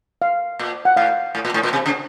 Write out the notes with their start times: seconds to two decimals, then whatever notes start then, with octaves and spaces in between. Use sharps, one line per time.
0.22 F5
0.59 A#2
0.85 F#5
0.97 A2 F5
1.35 A2
1.45 A#2
1.54 A2
1.63 A#2
1.73 C3
1.86 C#3